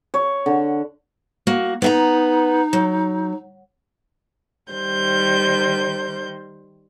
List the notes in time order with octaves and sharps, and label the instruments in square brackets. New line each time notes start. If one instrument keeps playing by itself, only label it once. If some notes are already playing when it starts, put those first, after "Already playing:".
[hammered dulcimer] C#5
D3
[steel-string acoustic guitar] A#3 F#4
[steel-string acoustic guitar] B3 E5 A#5 [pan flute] D#4
[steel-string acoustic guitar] F#3
[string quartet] D#3 G3 C5 G6